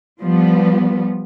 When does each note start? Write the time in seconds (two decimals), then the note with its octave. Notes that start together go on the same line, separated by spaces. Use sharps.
0.21 F3 G3 B3